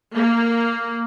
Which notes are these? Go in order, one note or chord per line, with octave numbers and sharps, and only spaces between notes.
A#3